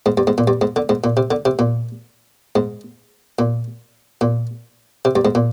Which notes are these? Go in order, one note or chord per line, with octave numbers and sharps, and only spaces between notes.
G#2
G2
G#2
A#2
G2
G#2
D3
G#2
A#2
C3
D3
C3
A#2
G#2
A#2
A#2
C3
G2
G#2
A#2